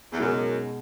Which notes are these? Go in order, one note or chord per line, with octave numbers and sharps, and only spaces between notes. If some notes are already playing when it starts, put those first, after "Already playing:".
E2
F#2 B2 G#3 D#4